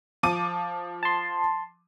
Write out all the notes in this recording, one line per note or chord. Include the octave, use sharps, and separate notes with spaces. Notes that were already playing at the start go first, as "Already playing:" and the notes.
F3 D6 D#7
A5 C6